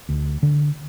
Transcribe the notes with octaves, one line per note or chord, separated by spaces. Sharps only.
D2
D3